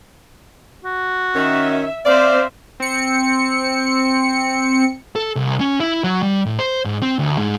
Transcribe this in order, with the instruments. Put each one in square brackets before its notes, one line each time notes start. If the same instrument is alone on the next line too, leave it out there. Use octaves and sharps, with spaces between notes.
[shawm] F#4
[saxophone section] D#3 C#4 [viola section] E5
[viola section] C4 C5 E5 [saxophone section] D5 [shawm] F5
[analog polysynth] C4 C#7
[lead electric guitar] A4
C2
C#4
E4
F#3
G3
A2
C5
G#2
C4
D2
G#2